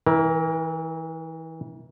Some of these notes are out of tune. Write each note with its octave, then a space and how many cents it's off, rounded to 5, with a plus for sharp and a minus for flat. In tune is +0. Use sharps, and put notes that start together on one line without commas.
E3 -30 A#4 +15